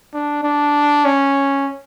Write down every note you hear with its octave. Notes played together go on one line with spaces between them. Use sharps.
D4
D4
C#4